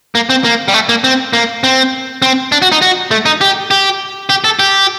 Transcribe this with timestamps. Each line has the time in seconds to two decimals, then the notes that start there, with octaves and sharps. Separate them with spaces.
0.15 A#3
0.30 C4
0.44 A#3
0.68 G3
0.74 A3
0.89 A#3
1.04 C4
1.33 A#3
1.64 C4
2.22 C4
2.52 D4
2.62 F#4
2.72 D#4
2.82 F#4
3.11 A3
3.26 D#4
3.41 G4
3.71 G4
4.30 G4
4.44 A4
4.59 G4